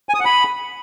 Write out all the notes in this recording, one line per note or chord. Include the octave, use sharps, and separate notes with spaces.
G#5
D#6
F#5
B5